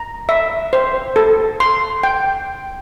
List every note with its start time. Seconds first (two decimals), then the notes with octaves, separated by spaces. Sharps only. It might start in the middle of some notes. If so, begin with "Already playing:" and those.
Already playing: A#5
0.29 E5
0.73 C5
1.16 A4
1.60 C6
2.03 G5